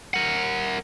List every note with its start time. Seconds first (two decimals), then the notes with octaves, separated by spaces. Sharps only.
0.14 A#4 F#5